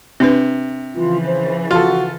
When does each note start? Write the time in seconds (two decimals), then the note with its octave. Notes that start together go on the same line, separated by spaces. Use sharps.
0.20 C3 C4 D4 B4
0.94 C#3 E3 F3 F4
1.26 C5
1.71 F4 F#4 A4